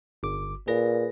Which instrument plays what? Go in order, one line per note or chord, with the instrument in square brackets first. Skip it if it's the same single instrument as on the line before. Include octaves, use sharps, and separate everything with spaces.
[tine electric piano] G1 D6
[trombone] A#2 [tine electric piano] G#4 B4 A#6